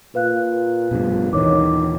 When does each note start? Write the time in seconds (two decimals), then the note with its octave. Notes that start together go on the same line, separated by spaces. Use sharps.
0.15 A#2 B4 F5 F#6
0.91 A#1 G2 B2
1.33 D#2 A#2 D#3 E3 C#5 D6